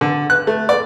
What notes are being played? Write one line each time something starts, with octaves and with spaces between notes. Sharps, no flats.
D3
F#6
A3
D5